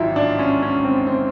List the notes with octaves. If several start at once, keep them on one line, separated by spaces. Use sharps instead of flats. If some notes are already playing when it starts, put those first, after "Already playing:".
Already playing: A1 G#2 D#3 F#3 E4 F4
D4
C#4
C#4
C4
C4